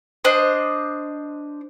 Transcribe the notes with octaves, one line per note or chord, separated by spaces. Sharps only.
D4 C5 D#5